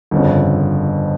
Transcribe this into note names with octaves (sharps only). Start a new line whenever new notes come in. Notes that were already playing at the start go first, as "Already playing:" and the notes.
G1 F2 C#3